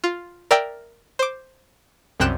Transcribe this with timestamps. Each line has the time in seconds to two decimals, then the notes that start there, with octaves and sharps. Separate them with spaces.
0.04 F4
0.51 A#4 D5 E5 G5
1.19 C5 D6
2.20 C2 F#2 C3 G5 F#6 E7